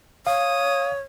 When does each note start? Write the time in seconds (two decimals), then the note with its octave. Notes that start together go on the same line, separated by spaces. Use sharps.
0.27 C#5 F5 D#6